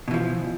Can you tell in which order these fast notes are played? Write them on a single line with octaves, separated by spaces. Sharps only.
B2 E3 F3